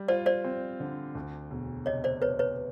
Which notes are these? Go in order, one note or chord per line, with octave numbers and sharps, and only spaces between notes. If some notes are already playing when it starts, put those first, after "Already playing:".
Already playing: G3
F4 C5 D5
C5 D5
C4
D3
D2
E1
C3 C#5 D#5
C5 D5
E1 B4 C#5
B4 C#5